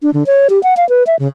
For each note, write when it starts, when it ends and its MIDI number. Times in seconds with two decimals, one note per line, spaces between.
0.02 0.10 62
0.14 0.23 50
0.26 0.48 73
0.50 0.61 67
0.63 0.74 78
0.77 0.87 77
0.89 1.03 71
1.07 1.16 76
1.19 1.27 49